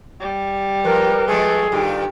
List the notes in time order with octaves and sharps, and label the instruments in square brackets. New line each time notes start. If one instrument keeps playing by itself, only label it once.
[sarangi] G3
[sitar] F3 [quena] A#4 [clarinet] B4
[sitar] F3 G#3 A3 [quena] G#4
[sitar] G2 D#3 F4 [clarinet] G4